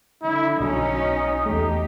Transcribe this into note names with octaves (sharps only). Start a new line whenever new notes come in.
D3 E4
B1 C#4 D#4 F#4 D#5
E2 A3 D#4 G4